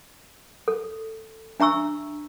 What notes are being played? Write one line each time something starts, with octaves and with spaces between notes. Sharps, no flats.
A4
D4 E5 A#5 C#6 E6